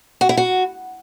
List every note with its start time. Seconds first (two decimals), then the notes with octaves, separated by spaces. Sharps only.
0.21 F#4
0.29 E4
0.37 F#4